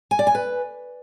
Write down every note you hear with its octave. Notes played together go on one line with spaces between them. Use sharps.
G#5
D5
G#5
B4